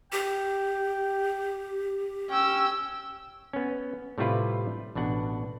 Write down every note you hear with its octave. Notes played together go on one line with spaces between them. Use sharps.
G4 G5
C#4 G5 E6
B3 C#4
A2 C3 G3 E4 F4 B4
A1 B2 D4 F#5